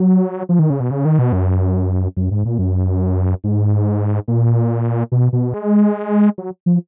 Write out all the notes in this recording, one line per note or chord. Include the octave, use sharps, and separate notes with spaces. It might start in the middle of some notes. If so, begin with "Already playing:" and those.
Already playing: F#3
F3
D#3
C#3
B2
C#3
D#3
B2
F#2
F#2
G#2
A#2
F#2
G#2
A#2
B2
B2
G#3
F#3
F3